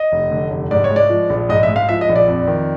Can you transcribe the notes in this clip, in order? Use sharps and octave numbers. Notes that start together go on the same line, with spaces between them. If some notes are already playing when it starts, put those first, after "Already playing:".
Already playing: D#5
F1
D3
F1
G#2 D5
C#5
G#3
D5
F3
A#1
G#2 D#5
E5
G#3
F5
F3 E5
D#5
A#1
D5
F2
D#3